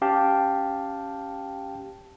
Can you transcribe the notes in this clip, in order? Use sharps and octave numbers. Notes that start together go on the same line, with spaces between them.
C#4 G4 F5 G5 A5